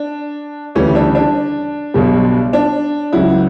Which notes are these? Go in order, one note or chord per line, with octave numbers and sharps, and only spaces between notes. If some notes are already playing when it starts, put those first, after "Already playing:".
Already playing: D4
D2 C#3 E3 G3 C#4
D4
D4
B1 B2 G3
D4
C#2 C#3 F#3 E4